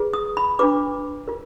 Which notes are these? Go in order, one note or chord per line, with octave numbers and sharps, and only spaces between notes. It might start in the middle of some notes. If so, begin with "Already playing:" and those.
Already playing: F4 G#4 B4
D#6
B5
D4 F4 B4 D6
F4 A#4